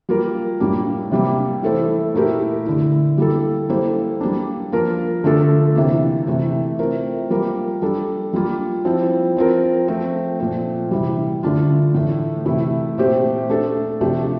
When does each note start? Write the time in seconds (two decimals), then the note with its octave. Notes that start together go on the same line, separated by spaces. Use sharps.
0.09 G3 A#3 F4 A#4
0.60 A2 G3 A#3 D4
1.12 C3 G3 A#3
1.63 E3 A3 E4 A4 C5
2.14 A#2 A3 E4 G4 A#4
2.66 D3 A3 E4
3.18 G3 A#3 E4 A4
3.69 G3 A#3 E4 A4 C5
4.21 G3 A#3 D4
4.72 F3 A#3 F4 A#4
5.24 D3 A3 D4 F4 A4
5.75 C3 E3 A#3
6.27 C3 E3 A3
6.79 A3 C4 F4 A#4
7.31 G3 A#3 F4 A#4
7.82 G3 D4 A4
8.33 G3 A#3 F4
8.85 F3 C4 E4
9.37 F3 C4 F4 A#4
9.88 F3 A3 C4
10.40 A#2 F3 A3 C4
10.91 C3 E3 G3
11.43 D3 A3 D4 F4
11.94 A2 E3 A3
12.46 C3 E3 A3 E4
12.98 A#2 A3 C4 G4 C5
13.49 A3 D4 A4
14.01 C3 F3 A3 D4 G4